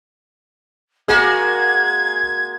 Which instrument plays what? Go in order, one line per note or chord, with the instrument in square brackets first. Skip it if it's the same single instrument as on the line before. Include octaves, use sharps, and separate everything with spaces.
[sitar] G#3 A#3 F#4 [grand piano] G#4 [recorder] G#6